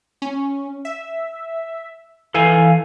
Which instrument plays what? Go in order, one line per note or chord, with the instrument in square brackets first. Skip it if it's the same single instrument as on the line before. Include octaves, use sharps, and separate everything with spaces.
[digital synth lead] C#4
E5
[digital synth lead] E3 [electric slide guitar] A4 F5 G#5